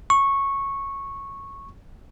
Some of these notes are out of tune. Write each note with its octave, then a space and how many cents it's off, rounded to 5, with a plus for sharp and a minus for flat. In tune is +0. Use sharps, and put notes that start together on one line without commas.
C#6 -10